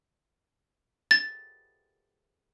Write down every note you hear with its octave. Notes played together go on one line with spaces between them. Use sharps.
A6